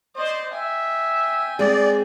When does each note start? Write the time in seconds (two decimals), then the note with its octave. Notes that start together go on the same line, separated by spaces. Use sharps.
0.15 C5 D5 D#5
0.54 E5 G5 G#5
1.59 G#3 C4 G#4 D5